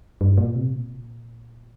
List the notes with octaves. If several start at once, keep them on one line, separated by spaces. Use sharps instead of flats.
G2
A#2
C3
A#2